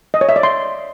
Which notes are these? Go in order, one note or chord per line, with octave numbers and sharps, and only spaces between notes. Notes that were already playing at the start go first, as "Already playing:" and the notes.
D#5
C#5
E5
D5
C6